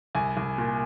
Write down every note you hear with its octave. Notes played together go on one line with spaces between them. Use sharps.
C2 G#5
C2
A#2